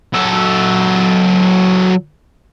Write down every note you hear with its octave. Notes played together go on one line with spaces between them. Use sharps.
F#3 A4